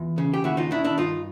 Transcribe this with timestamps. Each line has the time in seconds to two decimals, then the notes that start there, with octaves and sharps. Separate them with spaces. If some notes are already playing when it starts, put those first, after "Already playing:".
Already playing: E2 F4
0.18 C#3
0.34 G4
0.44 D#2 E4 F#4
0.57 D#4 F4
0.71 D#3 D4 E4
0.85 D4 E4
0.98 G2 D#4 F4